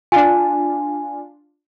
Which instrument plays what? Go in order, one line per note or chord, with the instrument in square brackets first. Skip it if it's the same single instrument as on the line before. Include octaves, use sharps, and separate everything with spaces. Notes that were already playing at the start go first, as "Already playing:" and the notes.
[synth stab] D4 F4 [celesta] G#5